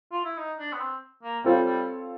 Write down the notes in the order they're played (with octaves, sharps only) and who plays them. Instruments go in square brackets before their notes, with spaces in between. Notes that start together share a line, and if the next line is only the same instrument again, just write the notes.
[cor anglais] F4
E4
D#4
D4
B3
C4
A#3
[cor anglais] G3 [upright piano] C4 F4 A4 C#5 F5
[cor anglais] G3